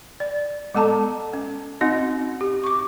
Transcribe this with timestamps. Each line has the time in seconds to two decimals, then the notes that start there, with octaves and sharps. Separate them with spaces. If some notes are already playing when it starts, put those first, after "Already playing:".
0.20 D5
0.75 G#3 B3 A4 A5 A#5
1.34 C#4
1.81 C4 D#4 F#4 D#5
2.41 G4
2.64 C#6 D6